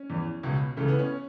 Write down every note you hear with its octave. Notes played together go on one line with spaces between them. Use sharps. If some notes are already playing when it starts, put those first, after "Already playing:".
Already playing: C#4
E2 E3
C#2 B2
C#2 C#3 E3 A3
B3
C#4